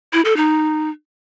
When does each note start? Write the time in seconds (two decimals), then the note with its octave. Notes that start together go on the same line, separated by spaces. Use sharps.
0.13 E4
0.25 A4
0.37 D#4